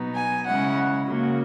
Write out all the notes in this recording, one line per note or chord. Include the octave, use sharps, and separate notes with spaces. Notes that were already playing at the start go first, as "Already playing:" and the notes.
Already playing: B2 F#3 B3 D#4
G#5
C#3 G#3 C#4 E4 F#5
C#3 F#3 A#3